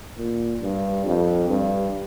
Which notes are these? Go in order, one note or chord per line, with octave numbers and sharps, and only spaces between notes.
A#2
G2
F2
G2